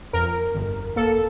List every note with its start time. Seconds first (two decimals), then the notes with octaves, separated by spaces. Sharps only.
0.13 F2 A#4
0.55 G1
0.96 A#3 A4